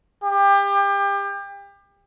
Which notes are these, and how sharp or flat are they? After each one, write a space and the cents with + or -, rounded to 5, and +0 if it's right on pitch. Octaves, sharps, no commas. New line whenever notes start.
G4 +30